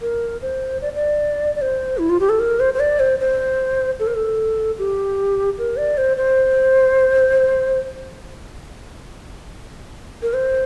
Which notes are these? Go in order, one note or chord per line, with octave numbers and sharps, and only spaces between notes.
A#4
C5
D5
D5
D5
C5
E4
F4
G4
A4
A#4
C5
C5
D5
C5
C5
A4
A#4
A4
G4
A#4
D5
C5
C5
A#4
C5